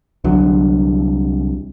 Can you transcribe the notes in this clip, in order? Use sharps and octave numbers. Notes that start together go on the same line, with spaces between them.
C2 D3 F#3